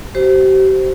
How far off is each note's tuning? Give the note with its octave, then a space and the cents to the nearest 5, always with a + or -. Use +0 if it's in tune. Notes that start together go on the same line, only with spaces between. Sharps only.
G4 -40 C5 +0